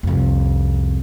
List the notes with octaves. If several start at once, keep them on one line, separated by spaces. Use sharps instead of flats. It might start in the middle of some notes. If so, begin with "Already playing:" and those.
C2 F2